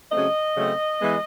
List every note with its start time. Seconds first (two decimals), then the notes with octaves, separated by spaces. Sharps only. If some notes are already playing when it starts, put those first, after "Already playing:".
0.12 C#3 F#3 A3 C4 D#5
0.56 C#3 F#3 A3 C4
1.01 E3 G#3 B3